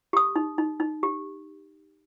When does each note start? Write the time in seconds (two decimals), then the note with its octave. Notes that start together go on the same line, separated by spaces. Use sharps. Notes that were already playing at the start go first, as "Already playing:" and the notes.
0.13 G4 D#6
0.36 D#4
0.58 D#4
0.80 D#4
1.03 G4